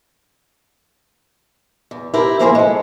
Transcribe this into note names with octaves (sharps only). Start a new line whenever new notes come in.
E2
E4 G4 A#4 C5
E3 F3 A#3 E4 G#4 C5
G#3 A4